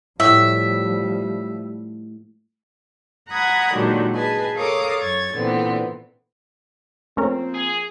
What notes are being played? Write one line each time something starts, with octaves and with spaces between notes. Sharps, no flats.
A2 F3 G3 E5
F#5 A#5 B5 D#6 F#6 G#6
A#2 D3 D#3 F#3 G#3 G4
G#4 B4 D#5 G#5 A5
A4 A#4 C#5 F5 D6 D#6
F#2 C#5 G#6 A6
A#2 D3 E3 B3 C4
F3 A3 A#3 C4 C#4 A#4
G#4